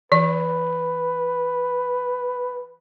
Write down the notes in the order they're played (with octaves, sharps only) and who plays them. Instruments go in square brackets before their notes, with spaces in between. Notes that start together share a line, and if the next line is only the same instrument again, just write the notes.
[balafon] E3 D5 [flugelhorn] B4